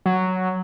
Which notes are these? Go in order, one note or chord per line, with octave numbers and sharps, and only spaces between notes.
F#3